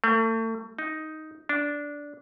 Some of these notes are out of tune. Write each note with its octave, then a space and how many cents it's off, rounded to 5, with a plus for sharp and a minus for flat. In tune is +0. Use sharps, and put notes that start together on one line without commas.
A3 +35
D#4 +5
D4 -10